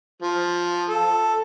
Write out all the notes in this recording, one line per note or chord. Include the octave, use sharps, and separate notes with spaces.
F3
A4